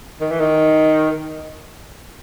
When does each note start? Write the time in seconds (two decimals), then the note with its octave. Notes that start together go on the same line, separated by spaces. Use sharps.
0.20 D#3
0.31 E3
0.40 D#3